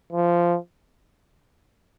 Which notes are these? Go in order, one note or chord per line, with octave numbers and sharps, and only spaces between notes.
F3